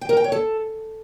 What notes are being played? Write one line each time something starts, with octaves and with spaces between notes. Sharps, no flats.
G5
A#4
G5
C#5
A4